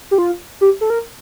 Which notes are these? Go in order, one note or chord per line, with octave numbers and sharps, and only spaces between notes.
G4
F4
G4
A4
A#4